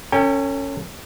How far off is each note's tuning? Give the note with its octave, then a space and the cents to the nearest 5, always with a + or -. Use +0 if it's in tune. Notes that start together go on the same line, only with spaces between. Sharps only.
C#4 +0 A4 +40 G5 +35